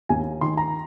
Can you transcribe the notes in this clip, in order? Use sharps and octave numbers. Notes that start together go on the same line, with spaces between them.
D#2 G#5
D#3 C6
A#5